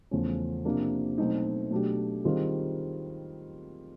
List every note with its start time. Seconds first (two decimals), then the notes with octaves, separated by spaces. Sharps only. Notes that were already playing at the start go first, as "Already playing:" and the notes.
0.11 E2 C#3 F3 A3 C#4
0.65 C3 F3 A#3 D4
1.18 B2 F#3 A3 C4 D#4
1.71 B2 F#3 A3 D4 G4
2.24 D#3 G3 C4 F4 G#4